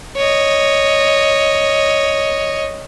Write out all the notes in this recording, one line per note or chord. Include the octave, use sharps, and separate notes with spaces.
C#5 D#5